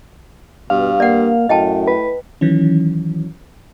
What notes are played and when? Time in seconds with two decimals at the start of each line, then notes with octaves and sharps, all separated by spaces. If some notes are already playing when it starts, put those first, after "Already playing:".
0.70 G2 B2 F5
1.00 A#3 D5 F#5
1.49 F#2 A2 D#5 G5 A5
1.88 B4
2.41 D#3 E3 F#3 C#4